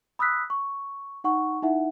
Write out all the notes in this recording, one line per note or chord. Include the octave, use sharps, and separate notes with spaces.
B5 D#6 E6 F#6 B6
C#6
D#4 F#5 C#6
D#4 E4 E5 F#5